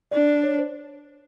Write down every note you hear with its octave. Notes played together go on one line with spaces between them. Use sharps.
D4 D5
C#5
C5